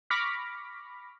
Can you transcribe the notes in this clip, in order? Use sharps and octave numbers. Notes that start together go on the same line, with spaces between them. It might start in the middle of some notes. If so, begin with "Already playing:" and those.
B5 C#6 D6 F6 A#6 B6